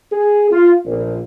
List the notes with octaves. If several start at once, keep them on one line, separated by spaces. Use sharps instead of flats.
G#4
F4
A#1